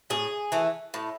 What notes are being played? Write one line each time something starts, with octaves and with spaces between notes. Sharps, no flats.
A2 G#4
E3 A3
A2